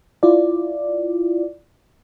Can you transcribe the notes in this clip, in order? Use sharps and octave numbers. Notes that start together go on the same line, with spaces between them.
E4 F4 D5